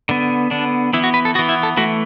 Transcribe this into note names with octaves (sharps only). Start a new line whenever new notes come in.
D3 B3
D3 B3 D4
E3 B3 E4
F#4
B4
A4
E3 B3 F#4
E4
A4
E3 A3 F#4